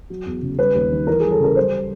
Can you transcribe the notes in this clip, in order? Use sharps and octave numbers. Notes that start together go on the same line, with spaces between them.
F#3
E2
C#3
G3 B4
D#2
D#3
E3 A#4
G3 G#4
A4
C#3 A#4
G3 C5